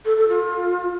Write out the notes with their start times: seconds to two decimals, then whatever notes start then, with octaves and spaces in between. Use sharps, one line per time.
0.05 A4
0.17 A4
0.29 F4